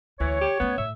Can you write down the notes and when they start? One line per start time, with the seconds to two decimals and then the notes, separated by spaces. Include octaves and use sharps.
0.20 D2 E3 C#5
0.41 G4
0.60 F#2 A3 B3
0.78 A2 E5